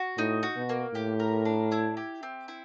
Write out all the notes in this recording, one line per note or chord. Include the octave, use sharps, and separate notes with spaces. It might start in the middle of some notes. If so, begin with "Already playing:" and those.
Already playing: F#4
A2 D#4
F#4
B2
A#3
A2 G4
A#4
D4
E4
G4
C4
E4